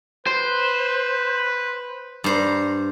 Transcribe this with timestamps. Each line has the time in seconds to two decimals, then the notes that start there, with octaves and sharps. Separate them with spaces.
0.27 B4 C5
2.24 G2 C5 A#5